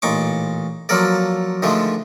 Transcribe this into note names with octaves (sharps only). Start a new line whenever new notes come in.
A1 A#2 D#4 C#6 D6
F3 F#3 A#3 A4 A#4 D5
D3 D#3 F3 G#3 A3